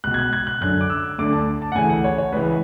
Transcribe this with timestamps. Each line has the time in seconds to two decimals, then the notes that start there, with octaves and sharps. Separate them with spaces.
0.04 C#2 B2 F#6
0.14 G#6
0.19 F#6
0.33 G#6
0.47 F#6
0.61 F#2 D3 F#6
0.81 D6
0.90 E6
1.18 D2 D3 D6
1.33 A5
1.62 A5
1.72 F#5
1.75 D2 C#3 E3 G#5
1.89 F#5
2.04 C#5
2.18 C#5
2.32 C#2 C#3 E3 B4